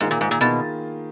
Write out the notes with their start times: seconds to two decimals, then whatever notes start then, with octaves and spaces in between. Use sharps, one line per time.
0.01 G#2 D#3 A#3 F4 G#4
0.11 A#2
0.21 G#2
0.31 A#2
0.41 B2 D#3 A#3 F4 G#4